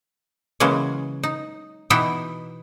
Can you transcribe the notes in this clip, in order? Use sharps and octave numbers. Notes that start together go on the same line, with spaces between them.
C#3 E3 F#3 G#3 A#3 C#4
D#4
B2 E3 B3 D#4 E4 G5